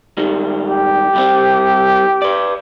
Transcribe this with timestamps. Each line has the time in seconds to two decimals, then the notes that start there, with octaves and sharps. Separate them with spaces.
0.17 G#2 D#3 G3
0.69 G4
1.14 C2 G3 C4
2.22 B4 D5